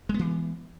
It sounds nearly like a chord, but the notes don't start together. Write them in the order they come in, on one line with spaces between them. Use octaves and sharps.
G#3 B3 E3